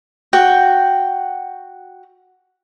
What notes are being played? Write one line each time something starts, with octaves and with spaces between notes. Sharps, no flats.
F#4 G5